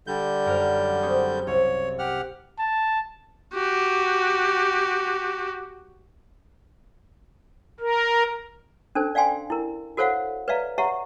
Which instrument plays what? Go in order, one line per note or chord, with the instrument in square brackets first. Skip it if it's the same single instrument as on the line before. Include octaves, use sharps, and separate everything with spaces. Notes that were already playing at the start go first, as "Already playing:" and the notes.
[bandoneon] D3 G3 G6
[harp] F#2 A#4 F6
C4 C#4 G#4
[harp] C2 [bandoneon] C#5
[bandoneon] G4 F#5 F6
[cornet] A5
[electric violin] F#4 G4
[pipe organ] A#4
[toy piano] C#4 D4 A4 C5
D5 F5 G5 G#5 C6
E4 A#4
F#4 A4 C5 C#5 F5 F#5
B4 C#5 D5 E5 F5 A#5
G4 C#5 E5 F#5 A#5